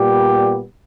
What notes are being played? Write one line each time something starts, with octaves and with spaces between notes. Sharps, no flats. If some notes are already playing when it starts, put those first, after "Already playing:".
Already playing: A#2 G3 B3 G4